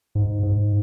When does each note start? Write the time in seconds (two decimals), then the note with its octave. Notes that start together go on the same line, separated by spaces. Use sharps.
0.15 G#2
0.43 G#2